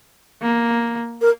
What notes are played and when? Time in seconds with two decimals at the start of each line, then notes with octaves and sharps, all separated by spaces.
0.42 A#3
1.21 A#4